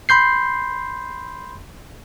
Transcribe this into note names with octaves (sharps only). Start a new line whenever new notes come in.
B5 C6 G6 C7